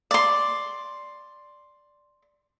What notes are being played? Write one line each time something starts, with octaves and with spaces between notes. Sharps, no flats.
D5 C6